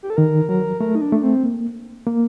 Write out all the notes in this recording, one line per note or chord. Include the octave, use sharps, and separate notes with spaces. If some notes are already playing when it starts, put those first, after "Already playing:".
G4
A4
D#3 A#4
F#3 A#4
A3 A#4
D#4
D4
A3
C4
A#3
A#3